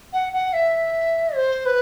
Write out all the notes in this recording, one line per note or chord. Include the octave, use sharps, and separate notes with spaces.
F#5
F#5
E5
C5
B4